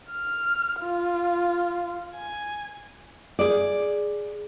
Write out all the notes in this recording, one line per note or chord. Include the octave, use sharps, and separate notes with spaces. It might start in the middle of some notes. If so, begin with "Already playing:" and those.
F6
F4
G#5
G#4 D5